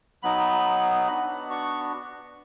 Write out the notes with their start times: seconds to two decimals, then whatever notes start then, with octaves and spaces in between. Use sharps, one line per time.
0.23 F#3 B3 D#4 B5
1.07 B3 D4 F#4 B5
1.51 C#6